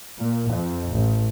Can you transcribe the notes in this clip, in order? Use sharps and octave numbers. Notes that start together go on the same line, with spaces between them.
A#2
F2
A1